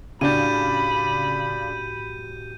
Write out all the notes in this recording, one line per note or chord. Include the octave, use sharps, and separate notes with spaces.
A2 C#3 D4 F#4 G4 B5 G6 D#7